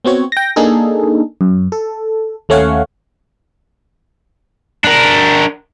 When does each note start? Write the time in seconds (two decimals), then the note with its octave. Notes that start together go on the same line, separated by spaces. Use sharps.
0.05 B3 C4 F#4 C#5
0.32 G5 A#6
0.56 A#3 D4 D#4 G#4 A4
1.41 F#2
1.72 A4
2.49 D#2 A3 C#4 C#5 F5 F#5
4.84 D4 A#4